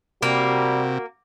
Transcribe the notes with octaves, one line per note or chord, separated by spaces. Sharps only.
C3 G3 A#3 F#4